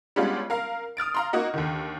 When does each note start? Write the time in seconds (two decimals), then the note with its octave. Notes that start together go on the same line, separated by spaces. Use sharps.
0.16 G3 G#3 B3 C#4 D4 F4
0.50 A#4 F5 A#5
0.97 D#6 F6 A6 D7
1.14 F5 A#5 C6
1.33 A#3 D#4 F#4 D#5
1.54 D#2 D3 D#3